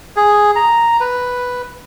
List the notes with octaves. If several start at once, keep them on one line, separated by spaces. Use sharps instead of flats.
G#4
A#5
B4